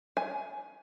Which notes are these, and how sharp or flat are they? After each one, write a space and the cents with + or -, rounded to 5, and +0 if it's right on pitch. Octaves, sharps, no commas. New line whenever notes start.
G#5 +15